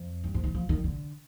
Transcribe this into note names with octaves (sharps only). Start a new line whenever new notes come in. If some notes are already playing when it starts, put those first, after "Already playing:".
Already playing: F2
G2
G#2
D#3
F3
D#3
D3